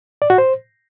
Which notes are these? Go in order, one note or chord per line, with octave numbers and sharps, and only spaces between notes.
D5
F#4
C5